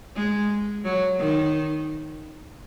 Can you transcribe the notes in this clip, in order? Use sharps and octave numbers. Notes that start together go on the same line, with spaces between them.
G#3
F#3
D#3